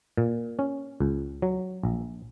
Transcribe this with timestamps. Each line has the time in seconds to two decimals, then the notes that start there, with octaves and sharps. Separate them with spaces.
0.17 A#2
0.59 C#4
1.00 C#2
1.42 F#3
1.83 A#1